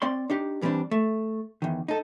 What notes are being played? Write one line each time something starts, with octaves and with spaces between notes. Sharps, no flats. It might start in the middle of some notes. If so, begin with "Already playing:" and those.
C4 D5 C6
D4 D#4 G4
G2 E3 G3 B3 C4 D4
A3
E2 D#3
D#4 A4